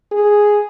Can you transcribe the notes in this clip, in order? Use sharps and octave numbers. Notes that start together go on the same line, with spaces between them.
G#4